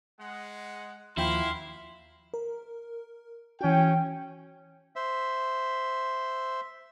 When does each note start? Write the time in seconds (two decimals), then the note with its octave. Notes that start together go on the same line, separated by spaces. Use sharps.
0.19 G#3 F#5
1.17 D#2 F3 A#3 E4 F#4 F5 G5 C6
2.34 A#4
3.61 E3 C#4 F#4 G5
4.96 C5 E5